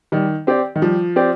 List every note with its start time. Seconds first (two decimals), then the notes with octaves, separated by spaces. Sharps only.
0.12 D#3 G3
0.47 C4 G4 D5
0.76 D#3
0.82 F3 G3
1.16 C4 G4 D5